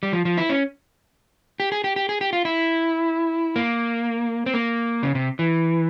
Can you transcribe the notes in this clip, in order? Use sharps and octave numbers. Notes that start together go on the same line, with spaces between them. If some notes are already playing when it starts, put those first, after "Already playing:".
G3
F3
F3
E4
C#4
G4
G#4
G4
G4
G#4
G4
F4
E4
A#3
C4
A#3
C#3
C3
E3